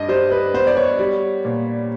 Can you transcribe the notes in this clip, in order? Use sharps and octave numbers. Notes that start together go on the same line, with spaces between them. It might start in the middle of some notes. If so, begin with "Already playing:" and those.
Already playing: G2 D#5
G3 C5
B4
B3 C5
D5
C#5
G3
A#2